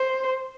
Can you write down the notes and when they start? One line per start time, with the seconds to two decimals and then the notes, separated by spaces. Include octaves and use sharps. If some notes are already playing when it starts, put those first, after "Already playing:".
Already playing: C5